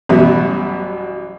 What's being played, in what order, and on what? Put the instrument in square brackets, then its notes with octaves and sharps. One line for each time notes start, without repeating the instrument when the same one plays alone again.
[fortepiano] A1 F#2 B2 G3 B3 E5